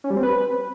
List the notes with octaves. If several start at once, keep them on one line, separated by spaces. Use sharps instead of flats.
C#4
G3
C4
B4